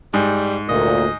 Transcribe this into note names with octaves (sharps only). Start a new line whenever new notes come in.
G#2 G3
D2 A#2 D#5